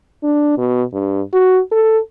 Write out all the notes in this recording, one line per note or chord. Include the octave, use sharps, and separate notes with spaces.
D4
B2
G2
F#4
A4